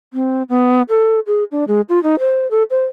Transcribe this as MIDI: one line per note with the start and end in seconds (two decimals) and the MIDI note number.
0.13 0.43 60
0.49 0.82 59
0.89 1.19 69
1.27 1.44 68
1.52 1.64 62
1.68 1.81 56
1.89 2.02 65
2.03 2.15 63
2.19 2.49 72
2.51 2.63 69
2.70 2.84 72